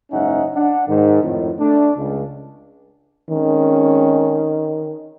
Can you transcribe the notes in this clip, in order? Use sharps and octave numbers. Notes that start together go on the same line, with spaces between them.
F#1 G#2 C#4 D#4 E5 F#5
D4 F#5
G#2 D#3
F2 A2 D#3
A3 D4
C#2
D#3 G#3 C4 C#4